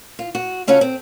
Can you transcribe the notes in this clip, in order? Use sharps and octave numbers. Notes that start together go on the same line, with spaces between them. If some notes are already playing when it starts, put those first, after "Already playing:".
F4
F#4
C#3 C#4 F4 F#4 A4
C4